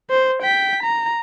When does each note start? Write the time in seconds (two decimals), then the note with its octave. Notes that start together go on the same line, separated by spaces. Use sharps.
0.10 C5
0.42 G5 B6
0.83 A#5